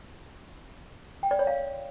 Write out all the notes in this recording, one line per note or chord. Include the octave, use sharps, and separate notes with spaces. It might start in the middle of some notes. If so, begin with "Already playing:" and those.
G5
D5
C#5
F5